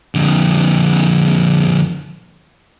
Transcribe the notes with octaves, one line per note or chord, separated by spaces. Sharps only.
F2 D3